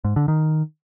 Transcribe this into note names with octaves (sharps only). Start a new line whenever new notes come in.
G#2
D3
D#3